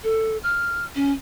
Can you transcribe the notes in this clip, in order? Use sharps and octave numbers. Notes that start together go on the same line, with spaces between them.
A4
F6
C#4